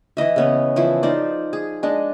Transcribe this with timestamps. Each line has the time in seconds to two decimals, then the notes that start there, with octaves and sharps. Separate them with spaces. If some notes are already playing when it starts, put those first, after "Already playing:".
0.17 E3 E4 D#5 E5
0.36 C#3 B3 C#4
0.76 E3 F3 E4
1.03 F3 D#4 C5 D5
1.53 G#4
1.83 G#3 D4 D#5